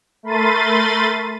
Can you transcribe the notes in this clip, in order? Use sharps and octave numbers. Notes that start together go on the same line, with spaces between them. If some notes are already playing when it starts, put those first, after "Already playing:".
A3 A#4 B5 C6 A6 D#7